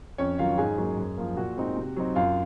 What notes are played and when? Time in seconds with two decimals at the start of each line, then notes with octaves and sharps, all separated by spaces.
0.18 F2 C#4 C#5
0.38 D#3 F#3 F4 F5
0.58 G#2 G#4 G#5
0.78 F#3 A#3 C#4
0.97 F#2
1.17 F3 A#3
1.37 A#2 F#4 F#5
1.57 G#3 C4 D#4
1.77 C3
1.96 F#3 C4 D#4
2.15 F#2 F4 F5